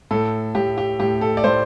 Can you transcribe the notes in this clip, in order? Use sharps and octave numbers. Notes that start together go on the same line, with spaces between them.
A2 A4
A2 G4
G4
A2 G4
A4
D5
A2 C5